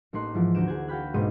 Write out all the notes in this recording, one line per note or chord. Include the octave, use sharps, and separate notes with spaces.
A1 A3 A#3 D#4 C6 F#6
G#2 E3 F3 E4
D2 A#3 F#4 G6 D7 E7
G#4 F#5 G#6
F#4 F5 G5 B5 F#6
B1 G#2 G#3 A#3 D#4 D#7